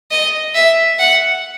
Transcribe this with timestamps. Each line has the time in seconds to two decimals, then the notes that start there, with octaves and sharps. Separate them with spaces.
0.11 D#5
0.55 E5
0.99 F#5